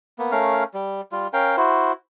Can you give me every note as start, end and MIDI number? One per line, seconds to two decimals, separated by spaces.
0.19 0.31 58
0.19 0.31 59
0.32 0.64 57
0.32 0.64 61
0.32 0.64 70
0.32 0.64 77
0.74 1.01 55
1.12 1.27 55
1.12 1.27 65
1.33 1.56 61
1.33 1.56 70
1.33 1.56 77
1.33 1.56 79
1.57 1.92 64
1.57 1.92 66
1.57 1.92 72